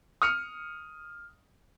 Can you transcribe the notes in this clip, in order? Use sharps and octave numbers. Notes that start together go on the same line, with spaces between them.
D#6 F6 C#7